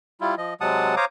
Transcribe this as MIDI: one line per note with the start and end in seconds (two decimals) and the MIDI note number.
0.21 0.35 55
0.21 0.35 64
0.21 0.35 65
0.38 0.54 53
0.38 0.54 75
0.61 0.95 48
0.61 0.95 54
0.61 0.95 56
0.61 0.95 78
0.61 0.95 81
0.61 0.95 87
0.97 1.05 72
0.97 1.05 73
0.97 1.05 77
0.97 1.05 82
0.97 1.05 86
0.97 1.05 87